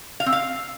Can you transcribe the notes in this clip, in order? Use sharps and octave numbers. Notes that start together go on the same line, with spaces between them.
F5
C4
F5